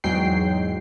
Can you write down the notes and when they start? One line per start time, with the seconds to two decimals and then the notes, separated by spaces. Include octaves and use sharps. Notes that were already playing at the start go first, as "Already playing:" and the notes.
0.04 E2 G#2 F#3 G#3 G5 C7